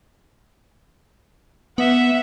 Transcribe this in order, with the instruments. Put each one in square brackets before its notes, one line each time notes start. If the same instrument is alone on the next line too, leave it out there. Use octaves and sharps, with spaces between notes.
[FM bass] B3 [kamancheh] E5 F#5